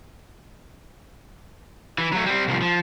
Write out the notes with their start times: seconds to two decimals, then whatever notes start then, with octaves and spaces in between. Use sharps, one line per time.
1.98 E3
2.12 F#3 A3
2.26 G3 C4
2.48 C2 F3
2.62 F3